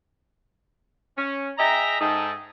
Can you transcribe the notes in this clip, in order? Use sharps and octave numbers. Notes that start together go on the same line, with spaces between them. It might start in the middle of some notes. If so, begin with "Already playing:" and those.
C#4
G#4 D#5 E5 G5 A#5
G#2 D#4 G#4 A4 G5 A5